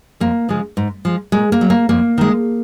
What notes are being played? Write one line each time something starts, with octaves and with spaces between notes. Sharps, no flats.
F2 A#3
C#3 F3 G#3
G#2
F3 G#3
A#2 G#3
A#3
F#3
A#3
F2 A#3
D#3 G#3